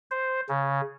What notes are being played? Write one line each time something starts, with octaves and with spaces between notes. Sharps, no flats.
C5
C#3